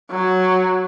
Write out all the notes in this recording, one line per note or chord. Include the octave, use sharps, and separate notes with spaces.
F#3